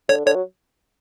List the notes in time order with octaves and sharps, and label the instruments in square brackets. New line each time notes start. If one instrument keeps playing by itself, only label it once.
[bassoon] D3 [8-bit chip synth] C#5
[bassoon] D3 [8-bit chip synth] C#5
[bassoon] F#3